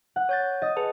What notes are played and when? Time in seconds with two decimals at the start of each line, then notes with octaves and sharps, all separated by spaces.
0.16 F#5
0.29 C#5 G6 A6
0.62 D#5 A6
0.77 G#4 B4 A5